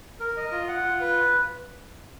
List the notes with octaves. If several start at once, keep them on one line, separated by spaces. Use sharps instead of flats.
A#4
D#5
F4
F#5
F4
B4